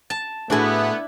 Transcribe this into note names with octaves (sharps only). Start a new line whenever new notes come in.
A5
A2 A3 B3 D4 E4 F#4 G#4